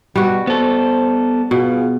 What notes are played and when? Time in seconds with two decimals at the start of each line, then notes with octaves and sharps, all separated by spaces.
0.15 B2 G3 F#4
0.47 B3 A4 C5
1.51 B2 B3 F4 G#4